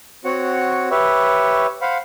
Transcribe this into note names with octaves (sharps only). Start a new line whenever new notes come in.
C4 F#4 C#5 F#5
G4 B4 C#5 E5
C5 F5 F#5 B5